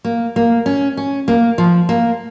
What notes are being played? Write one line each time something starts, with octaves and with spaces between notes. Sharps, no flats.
A#3
A#3
C#4
C#4
A#3
F3
A#3